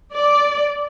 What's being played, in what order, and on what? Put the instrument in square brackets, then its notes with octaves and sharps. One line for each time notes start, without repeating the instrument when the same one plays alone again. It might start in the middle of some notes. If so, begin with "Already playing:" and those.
[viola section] D5